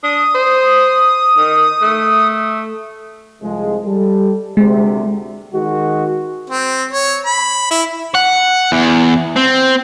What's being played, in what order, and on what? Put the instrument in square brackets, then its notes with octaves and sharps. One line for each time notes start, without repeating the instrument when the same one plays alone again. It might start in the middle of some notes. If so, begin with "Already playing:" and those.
[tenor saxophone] D4 [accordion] D#6
[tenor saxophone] C5
D#3
A3
[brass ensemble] C2 F3 G#3
G3 A4
[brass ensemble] D2 C3 [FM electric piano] G#3
[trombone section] D#3 G#3 F#4
[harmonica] C4
C#5
B5
E4
[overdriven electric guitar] F#5
E2
C4